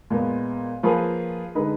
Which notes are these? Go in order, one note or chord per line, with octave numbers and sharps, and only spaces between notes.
A#2 G#3 B3
F3 A#3 F4 G#4 B4
D3 G#3 D#4 G#4 B4